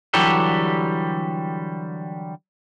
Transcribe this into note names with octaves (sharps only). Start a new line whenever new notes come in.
D3 E3 F#3 G3 G4 A4